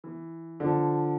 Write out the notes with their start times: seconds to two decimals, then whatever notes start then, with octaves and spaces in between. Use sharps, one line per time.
0.04 E3
0.60 D3 F3